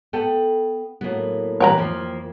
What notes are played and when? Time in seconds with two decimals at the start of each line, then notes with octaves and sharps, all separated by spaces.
0.13 B3 A4 G5
1.01 A2 F#3 A#3 B3
1.60 A#2 E3 G3 B4 C#5 G5 A#5
1.78 F2 F3 A#3 F4